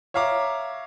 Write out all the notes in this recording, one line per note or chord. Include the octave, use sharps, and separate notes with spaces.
C#5 E5 F5 A#5 D6